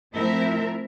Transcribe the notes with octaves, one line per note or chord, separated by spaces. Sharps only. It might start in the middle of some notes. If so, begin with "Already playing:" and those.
F3 A3 C4 E4 A#4 E5